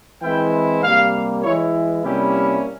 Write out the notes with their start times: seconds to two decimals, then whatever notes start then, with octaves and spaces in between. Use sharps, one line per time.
0.22 E3 G#3 C4 E4 G5
0.82 C3 G3 A#3 F5
1.43 E3 G#3 E4 C#5
2.03 C3 G3 A#3 C#4 E4 G4